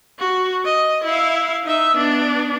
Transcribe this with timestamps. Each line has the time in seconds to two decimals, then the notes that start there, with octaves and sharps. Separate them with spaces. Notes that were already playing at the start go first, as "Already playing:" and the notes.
0.19 F#4
0.65 D#5
1.04 E4 F5
1.65 D#4 E5
1.97 B3 D4